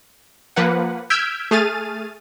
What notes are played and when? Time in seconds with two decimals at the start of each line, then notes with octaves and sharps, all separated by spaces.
0.56 F3 A#3 B4 F#5
1.10 E6 F6 G6 G#6 B6 D7
1.51 A3 G#4 F6 A6 D#7